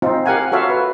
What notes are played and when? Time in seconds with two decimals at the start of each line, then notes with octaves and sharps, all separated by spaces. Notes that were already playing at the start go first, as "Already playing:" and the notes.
0.02 C4 D#4 F4
0.26 G4 A#4 F5 F#5 G#5
0.52 F4 F#4 A4 C#5 E5 F5
0.70 B4